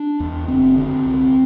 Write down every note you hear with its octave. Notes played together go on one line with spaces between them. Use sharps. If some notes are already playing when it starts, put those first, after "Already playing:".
Already playing: D4
E2
F#1 C4
D3 C4
C2